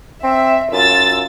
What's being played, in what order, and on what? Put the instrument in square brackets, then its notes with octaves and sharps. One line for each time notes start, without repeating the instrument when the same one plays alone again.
[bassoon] C4 [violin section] E5
[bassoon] F#2 [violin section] F4 E6 A6